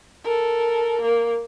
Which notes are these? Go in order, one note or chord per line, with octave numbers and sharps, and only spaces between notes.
A4 A#4
A#3 A#4